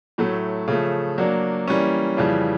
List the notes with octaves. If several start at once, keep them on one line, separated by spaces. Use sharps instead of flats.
A2 F#3 A3
C#3 F3 A3
F#3 A#3 D4
E3 G3 A#3 C#4
F2 C#3 E3 G3